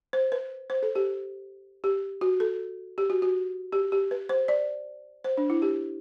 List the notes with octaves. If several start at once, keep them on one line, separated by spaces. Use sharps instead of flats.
C5
B4
C5
A4
G4
G4
F#4
A4
G4
F#4
F#4
G4
G4
B4
C5
D5
C5
D4
E4
G4